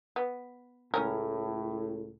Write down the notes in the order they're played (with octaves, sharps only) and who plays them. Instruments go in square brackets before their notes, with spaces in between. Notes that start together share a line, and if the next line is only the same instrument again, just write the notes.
[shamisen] B3
[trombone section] C#2 A2 [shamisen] A3 C#4 A#4